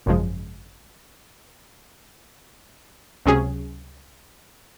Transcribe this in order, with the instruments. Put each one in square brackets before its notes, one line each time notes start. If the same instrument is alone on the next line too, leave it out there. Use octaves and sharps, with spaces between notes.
[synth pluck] G#1 F#2 C#3 F3 G#3
C#2 C3 F#3 C#4 G#4